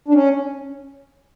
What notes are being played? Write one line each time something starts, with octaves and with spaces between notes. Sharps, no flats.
D4
C#4